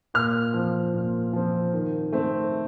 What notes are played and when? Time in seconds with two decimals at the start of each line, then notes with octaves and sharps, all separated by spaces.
0.14 A#2 F6
0.54 F3 C4
0.94 A#2
1.33 F3 C4
1.73 D#3
2.13 A3 C4